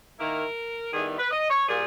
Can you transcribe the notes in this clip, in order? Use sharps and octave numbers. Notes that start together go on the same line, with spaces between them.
D#3 A#3 E4 A#4
D#3 G3 B3 E4 G#4
B4
D#5
C#5
A#2 G3 A#3 G#4